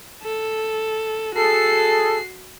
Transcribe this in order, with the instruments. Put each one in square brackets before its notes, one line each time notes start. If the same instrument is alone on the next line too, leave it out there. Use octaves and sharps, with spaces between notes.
[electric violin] A4
[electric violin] F#4 C7 [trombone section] G#4 A4